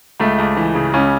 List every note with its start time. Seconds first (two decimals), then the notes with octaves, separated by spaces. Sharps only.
0.20 C#2 A3
0.38 C#2
0.57 E3
0.75 C#3
0.93 C#2 C#4